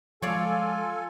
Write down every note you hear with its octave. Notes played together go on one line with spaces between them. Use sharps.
F3 G#3 F4 A4 C#5 D5 F5 G#5